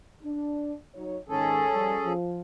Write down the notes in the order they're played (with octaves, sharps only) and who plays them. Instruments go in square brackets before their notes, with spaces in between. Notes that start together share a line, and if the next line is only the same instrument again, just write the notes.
[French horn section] D4
F#3 D#4 C#5
[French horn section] G#2 D#3 [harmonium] C#4 G#4 A4
[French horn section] F3 G3
F3